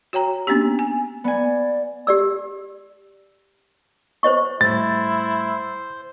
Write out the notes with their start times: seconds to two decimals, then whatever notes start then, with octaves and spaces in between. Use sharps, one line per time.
0.13 F#4 C#5 G5 A#5
0.47 A#3 B3 C#4 D4 G4
0.79 G#5
1.24 B3 D5 G#5
2.07 G4 D5 E6
4.23 C5 C#5 D#5 C#6
4.61 A2 G3 E4 C5 A6